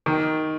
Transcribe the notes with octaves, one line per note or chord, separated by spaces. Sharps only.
D#3